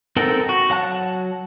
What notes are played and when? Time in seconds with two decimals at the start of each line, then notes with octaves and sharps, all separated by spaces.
0.16 C4 D#4 A4 A#4 F#5
0.49 F#4
0.70 F#3 F#5 A5 F#6